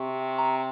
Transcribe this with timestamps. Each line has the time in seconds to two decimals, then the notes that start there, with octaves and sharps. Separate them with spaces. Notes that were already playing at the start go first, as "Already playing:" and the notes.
Already playing: C3 C#6
0.38 A#5